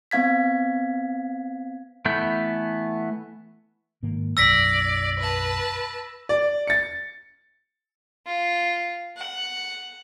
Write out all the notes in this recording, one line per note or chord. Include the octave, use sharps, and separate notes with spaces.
B3 C4 F5 G#6 B6
E3 A3 B3 B5 G6
G#2 D#3 A#3
F#1 B1 F#2 D5 E6 A#6 B6
B4 A5
D5
A6 C#7
F4
F#5